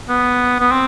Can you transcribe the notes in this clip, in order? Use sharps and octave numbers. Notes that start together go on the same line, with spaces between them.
B3
B3
C4